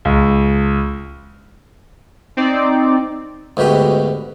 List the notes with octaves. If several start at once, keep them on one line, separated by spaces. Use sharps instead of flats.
C#2
C4 D#4 D5
D2 G#2 B2 G4 B4